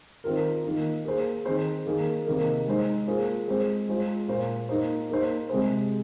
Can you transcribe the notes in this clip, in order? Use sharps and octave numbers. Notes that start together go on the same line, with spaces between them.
D#3 C4 F4 A#4
D#3 A#3 D#4
A#3 G#4 C5
D#3 C4 G#4 C5
D#3 A#3 G#4
C3 D#3 A#3 D#4 A#4
G#3 D#4 C5
A#3 F4 G#4 C5
G#3 C4 G#4 C5
G#3 F4 C5
A#2 A#3 F4 C5
A#3 D#4 C5
A#3 D#4 C5
C3 G#3 C4 G#4 C5